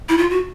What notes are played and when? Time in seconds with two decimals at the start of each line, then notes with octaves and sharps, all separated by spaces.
0.09 E4
0.18 F4
0.30 F#4